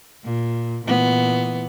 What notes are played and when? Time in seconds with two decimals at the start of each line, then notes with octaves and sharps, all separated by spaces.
0.24 A#2
0.85 A#2 E3 B3